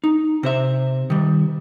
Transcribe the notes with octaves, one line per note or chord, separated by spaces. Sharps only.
D#4
C3 C5 E5
D#3 G3